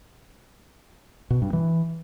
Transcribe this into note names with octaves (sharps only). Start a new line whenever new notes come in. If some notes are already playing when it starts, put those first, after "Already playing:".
B2
G2
E3